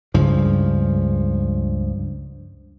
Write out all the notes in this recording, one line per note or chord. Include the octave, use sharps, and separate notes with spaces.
C#2 G2 C#3 F3